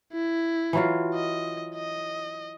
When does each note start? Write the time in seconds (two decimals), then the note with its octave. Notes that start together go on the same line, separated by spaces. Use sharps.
0.12 E4
0.73 E3 F#3 F4
1.14 D#5
1.75 D#5